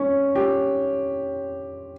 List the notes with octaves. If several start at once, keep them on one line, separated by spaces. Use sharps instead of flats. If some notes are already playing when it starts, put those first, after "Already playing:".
Already playing: C#4
G4